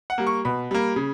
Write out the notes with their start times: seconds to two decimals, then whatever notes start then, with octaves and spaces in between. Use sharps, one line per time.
0.10 F#5
0.18 G3 A#3
0.27 C#6
0.45 B2 B5
0.71 G3 A#3
0.96 C#3